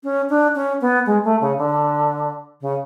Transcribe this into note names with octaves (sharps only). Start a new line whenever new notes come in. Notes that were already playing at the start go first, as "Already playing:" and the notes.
C#4
D4
C#4
B3
G#3
A3
C#3
D3
C#3